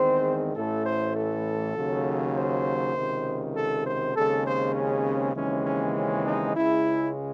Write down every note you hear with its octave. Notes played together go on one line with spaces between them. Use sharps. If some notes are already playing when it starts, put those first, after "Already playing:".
Already playing: E2 D#3 G#3 C4 C5
A1 A2 E3 A3 A4
C5
A4
D#2 C#3 F#3
C5
C#2 C3 D#3
A4
C5
D#2 C#3 G#3 C4 A4
C5
C#4
D#2 C#3 E3 G#3 C4 C#4
C#4
C#4
D#4
C#2 C#3 G#3 E4